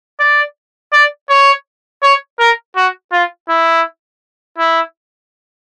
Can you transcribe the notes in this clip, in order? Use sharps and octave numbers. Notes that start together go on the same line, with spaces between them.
D5
D5
C#5
C#5
A#4
F#4
F4
E4
E4